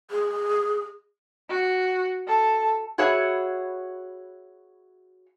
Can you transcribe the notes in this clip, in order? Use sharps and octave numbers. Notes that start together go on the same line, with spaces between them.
G#4
F#4
A4
F#4 G#4 B4 C#5 E5